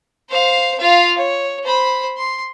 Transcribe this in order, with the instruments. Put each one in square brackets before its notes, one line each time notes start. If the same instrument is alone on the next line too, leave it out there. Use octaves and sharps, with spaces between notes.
[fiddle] C5 F5
F4 F5
C#5
C5 B5
C6